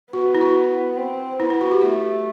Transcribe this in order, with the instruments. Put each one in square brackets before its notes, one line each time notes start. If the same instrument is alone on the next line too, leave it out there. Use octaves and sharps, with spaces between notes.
[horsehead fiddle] B3 [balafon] F#4
[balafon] E4
F#4
[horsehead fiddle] C4
[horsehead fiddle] B3 [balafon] E4
[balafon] E4
F#4
G4
[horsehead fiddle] A3 [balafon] G4